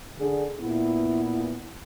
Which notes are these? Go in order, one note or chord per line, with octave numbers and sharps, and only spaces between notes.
D3 G#4
A#2 B3 E4